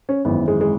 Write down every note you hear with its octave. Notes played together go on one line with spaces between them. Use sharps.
C#4
G#1 F#2 E3 B3
G#3
G#3